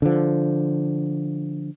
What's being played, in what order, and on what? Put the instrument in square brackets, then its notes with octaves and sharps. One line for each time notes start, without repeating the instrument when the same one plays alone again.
[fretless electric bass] D3 F3